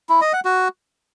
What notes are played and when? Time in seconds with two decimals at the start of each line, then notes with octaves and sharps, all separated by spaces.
0.09 E4
0.21 D#5
0.33 F#5
0.45 F#4